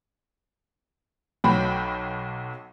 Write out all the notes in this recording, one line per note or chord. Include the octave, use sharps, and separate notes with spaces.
B1 F#3 F#4 G5 B5